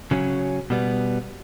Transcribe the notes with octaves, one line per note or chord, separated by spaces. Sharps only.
C#3 F#3 C#4
B2 G3 B3